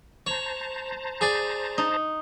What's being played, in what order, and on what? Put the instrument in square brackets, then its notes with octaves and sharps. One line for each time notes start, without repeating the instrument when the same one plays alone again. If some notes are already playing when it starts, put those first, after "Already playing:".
[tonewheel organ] C5 A5 A#5 [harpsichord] C#5
[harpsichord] G#4 D5
[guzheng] D#4